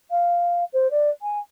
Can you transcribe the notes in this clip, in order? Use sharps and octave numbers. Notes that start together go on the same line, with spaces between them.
F5
C5
D5
G#5